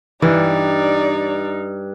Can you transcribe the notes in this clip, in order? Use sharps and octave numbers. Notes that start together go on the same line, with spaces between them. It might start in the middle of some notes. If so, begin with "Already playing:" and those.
G2 E3 D#4 D5